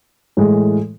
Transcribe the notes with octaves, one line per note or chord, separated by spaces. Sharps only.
A2 E3 G#3